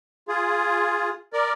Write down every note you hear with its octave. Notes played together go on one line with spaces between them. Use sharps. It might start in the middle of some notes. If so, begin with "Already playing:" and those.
F4 G#4
A#4 D5